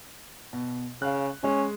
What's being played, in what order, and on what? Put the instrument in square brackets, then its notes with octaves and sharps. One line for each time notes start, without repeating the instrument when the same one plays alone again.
[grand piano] B2
[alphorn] C#3 [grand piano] F5 F#6
[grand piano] G#3 [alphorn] C#4